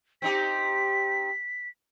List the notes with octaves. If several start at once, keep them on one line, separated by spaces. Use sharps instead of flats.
C4 D#4 G4 B6